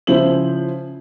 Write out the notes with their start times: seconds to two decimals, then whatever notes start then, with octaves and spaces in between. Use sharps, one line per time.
0.07 C#3 F3 E4 C5 F#7